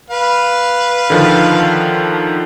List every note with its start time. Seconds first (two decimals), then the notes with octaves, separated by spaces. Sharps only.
0.10 B4 F5
1.10 D3 D#3 F3